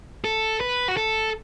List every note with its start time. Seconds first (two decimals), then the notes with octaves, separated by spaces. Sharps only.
0.24 A4
0.61 B4
0.88 F#4
0.97 A4